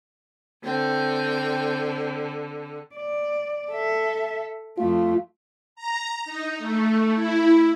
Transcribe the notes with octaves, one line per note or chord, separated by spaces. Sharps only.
D3 C4 G5
D5
A4 E5
F2 A3 F4
A#5
D#4
A3
E4